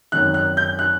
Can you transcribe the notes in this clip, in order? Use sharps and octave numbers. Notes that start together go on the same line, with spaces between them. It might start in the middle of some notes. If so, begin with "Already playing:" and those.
G#1 F#2 D#3 F#6
F#6
G6
F#6